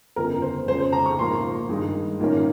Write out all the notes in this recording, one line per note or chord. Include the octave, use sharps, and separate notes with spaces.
G1 F2 C#3 A#4
C5
F2 C#3 G#3 C#4 C5
C5
A#5
C#6
A#1 G#2 F3 A#3 C6
G2 D#3 G#3 D#4
A#1 G#2 D#3 A#3 C#4